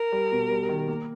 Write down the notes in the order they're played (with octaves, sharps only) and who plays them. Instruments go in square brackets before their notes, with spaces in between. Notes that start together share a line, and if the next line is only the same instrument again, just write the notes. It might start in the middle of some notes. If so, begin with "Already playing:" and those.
Already playing: [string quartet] A#4
[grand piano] G3
B2
G3
D#3
A#3